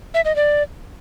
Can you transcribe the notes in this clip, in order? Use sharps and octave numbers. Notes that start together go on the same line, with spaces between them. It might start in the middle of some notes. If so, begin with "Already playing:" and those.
E5
D#5
D5